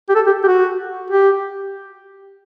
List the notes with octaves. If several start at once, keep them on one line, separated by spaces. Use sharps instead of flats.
G4
A4
G4
G4
F#4
G4